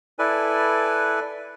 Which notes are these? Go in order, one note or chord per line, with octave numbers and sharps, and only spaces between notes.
E4 A4 B4 D5 G#5